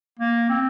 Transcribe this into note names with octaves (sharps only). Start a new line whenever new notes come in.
A#3
C4